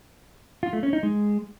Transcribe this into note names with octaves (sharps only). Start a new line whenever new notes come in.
F4
A3
C#4
D#4
G#3